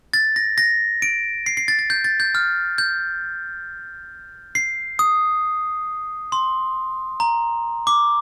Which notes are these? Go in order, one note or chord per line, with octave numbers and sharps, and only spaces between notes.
A6
A#6
A#6
D7
C7
C7
A6
A6
G6
A6
G6
F6
G6
C7
D#6
C6
A#5
D6